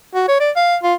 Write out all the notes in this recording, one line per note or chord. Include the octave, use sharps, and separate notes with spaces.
F#4
C#5
D5
F5
F4